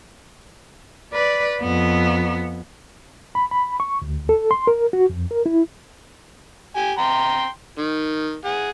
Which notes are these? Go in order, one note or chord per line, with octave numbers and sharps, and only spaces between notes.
B4 D5
F2 B3
B5
B5
C#6
D2
A4
C6
A#4
F#4
F2
A#4
E4
G4 G#5
G5 A#5 C6
D#3
G#4 F#5